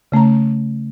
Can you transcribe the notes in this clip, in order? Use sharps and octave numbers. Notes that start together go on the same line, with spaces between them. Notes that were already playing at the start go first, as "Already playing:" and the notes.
C#3 A3 C#4 A#5